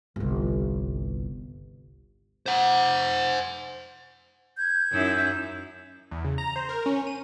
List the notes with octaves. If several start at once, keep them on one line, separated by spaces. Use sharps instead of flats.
G1 C2
C5 F#5
G6 G#6
F#2 D#4 E4
E2
C#3
A#5
C5
A#4
C#4
D#7